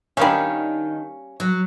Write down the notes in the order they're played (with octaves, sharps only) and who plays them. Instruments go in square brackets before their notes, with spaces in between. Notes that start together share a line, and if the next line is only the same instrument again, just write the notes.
[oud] D#3 D4 [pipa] G3 A#3 C#4
[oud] F#3